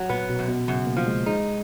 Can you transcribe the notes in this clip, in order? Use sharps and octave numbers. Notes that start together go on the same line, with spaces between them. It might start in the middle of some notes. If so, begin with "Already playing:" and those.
Already playing: F#3
A#2 B3
B2
F#2
B2
F#2 C#3
A#3
F3
G#3
G#3 D#4